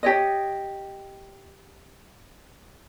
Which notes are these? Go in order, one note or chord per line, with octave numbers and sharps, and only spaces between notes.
G4 C#5 D#5